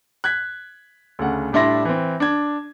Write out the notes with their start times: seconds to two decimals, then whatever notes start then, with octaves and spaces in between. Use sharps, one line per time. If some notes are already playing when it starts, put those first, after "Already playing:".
0.24 F#6 G#6 B6
1.19 D2 C#3 F#5
1.52 A2 G3 D4 E4 C6 A#6
1.85 E3 C4
2.20 D4 G#6